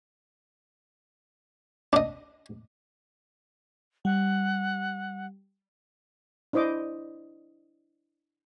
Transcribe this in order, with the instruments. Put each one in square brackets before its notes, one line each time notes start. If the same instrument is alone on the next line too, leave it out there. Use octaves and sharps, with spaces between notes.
[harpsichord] D4 D#5
[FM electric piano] G3 [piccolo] F#5
[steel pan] D4 E4 C5 D#5 D6